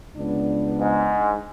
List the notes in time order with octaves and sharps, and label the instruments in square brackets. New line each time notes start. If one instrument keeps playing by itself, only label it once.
[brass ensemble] C#2 B3 D4
[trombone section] G#2